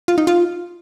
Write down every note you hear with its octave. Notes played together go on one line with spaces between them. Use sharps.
F4
D#4
F4